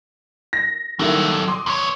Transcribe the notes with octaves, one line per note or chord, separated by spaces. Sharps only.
A#6
D#3 F#3 G3 E4 A4
C6 D6 D#6
E2 C#5